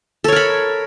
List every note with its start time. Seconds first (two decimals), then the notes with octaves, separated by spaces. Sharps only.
0.24 A4
0.28 C#5
0.32 A#4
0.36 B5